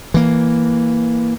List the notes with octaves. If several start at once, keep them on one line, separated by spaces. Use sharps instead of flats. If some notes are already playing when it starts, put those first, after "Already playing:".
E3 A#3